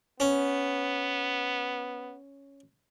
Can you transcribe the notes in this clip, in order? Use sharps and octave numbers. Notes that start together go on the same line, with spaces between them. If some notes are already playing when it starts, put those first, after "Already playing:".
B3 C#4